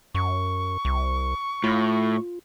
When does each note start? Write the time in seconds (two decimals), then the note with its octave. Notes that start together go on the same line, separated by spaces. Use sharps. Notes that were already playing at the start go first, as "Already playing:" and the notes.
0.15 F#2 C#6
0.85 C2
1.64 A2 F4